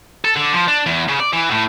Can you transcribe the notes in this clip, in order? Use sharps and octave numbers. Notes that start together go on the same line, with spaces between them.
A4
D3
F3
D4
E2
C#3
D5
E3
A2